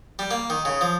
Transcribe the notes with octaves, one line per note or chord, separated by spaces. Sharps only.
G3
A#3
D#3
C#3
F3